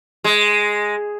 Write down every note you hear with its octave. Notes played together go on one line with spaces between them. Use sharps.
G#3